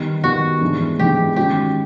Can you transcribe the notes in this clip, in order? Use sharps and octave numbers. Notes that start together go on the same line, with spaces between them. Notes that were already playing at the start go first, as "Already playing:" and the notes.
Already playing: D#3 G3 B3
D#3 G3 B3 F#4
G#2 E3 G#3 B3 D4
G#2 E3 G#3 B3 D4 G4
D#3 G#3 C#4 F#4 G4